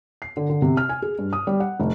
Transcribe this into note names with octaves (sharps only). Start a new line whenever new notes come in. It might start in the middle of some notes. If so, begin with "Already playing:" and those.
C7
D3
D3
C3
F6
G#5
G#4
G2
D#6
G3
F#5
F1